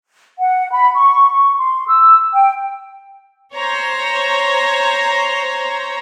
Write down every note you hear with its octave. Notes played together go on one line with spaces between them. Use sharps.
F#5
B5
C#6
C#6
C6
E6
G5
C5 C#5 A#5